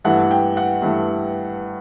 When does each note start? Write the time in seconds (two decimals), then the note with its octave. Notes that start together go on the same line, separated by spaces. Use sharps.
0.04 G2 E3 A3 F#5
0.31 G5
0.57 F#5
0.82 G2 E3 A3